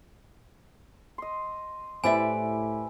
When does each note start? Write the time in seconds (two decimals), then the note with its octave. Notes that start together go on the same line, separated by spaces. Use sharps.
1.18 D#5 C6
2.04 A2 E4 G4 B4 C5 D5 E5 G#5